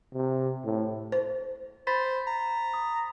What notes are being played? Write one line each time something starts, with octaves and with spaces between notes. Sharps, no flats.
C3
A2
C5
C5 B5 A6 B6
A#5
D#6